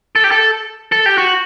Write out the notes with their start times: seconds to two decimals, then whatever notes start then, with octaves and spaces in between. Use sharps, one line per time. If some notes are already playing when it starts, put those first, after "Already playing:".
0.16 A4
0.24 G4
0.31 A4
0.92 A4
1.06 G4
1.18 F#4